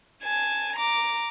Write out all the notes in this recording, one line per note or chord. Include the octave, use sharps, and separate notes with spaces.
G#5 A5
A#5 D6